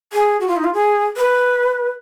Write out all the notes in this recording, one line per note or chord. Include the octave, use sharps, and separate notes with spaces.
G#4
F#4
F4
D#4
F4
G#4
B4